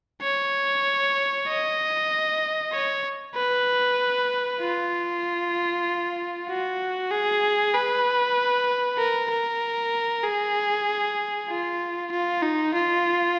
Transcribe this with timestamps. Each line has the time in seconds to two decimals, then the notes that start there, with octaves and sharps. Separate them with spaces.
0.22 C#5
1.48 D#5
2.72 C#5
3.35 B4
4.61 F4
6.49 F#4
7.11 G#4
7.73 B4
8.98 A#4
9.30 A#4
10.23 G#4
11.48 F4
12.11 F4
12.42 D#4
12.74 F4